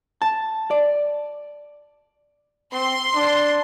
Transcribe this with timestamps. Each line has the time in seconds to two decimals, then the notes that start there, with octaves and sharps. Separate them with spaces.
0.22 A5
0.71 D5
2.73 C4 C6
3.15 D4